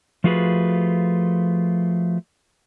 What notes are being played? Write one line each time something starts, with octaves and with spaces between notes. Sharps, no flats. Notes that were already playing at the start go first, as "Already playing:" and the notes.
F3 A3 F4 F#4 G#4 B4